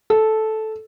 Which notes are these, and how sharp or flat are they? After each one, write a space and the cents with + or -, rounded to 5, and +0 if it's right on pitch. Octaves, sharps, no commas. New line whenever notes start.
A4 -10